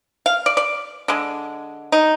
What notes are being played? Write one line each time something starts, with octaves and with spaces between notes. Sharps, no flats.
F5
D5
D5
D3 G#3
D#4